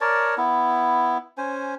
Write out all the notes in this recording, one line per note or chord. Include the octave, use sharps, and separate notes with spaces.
A#4 C#5 D5 A5
B3 E4
C#4 C5 G#5